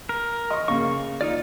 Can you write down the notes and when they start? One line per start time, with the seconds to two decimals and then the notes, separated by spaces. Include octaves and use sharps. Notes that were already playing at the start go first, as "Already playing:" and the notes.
0.09 A#4
0.51 D#5 C#6
0.68 C#3 A#3 C#6
1.21 D#4 F4 D5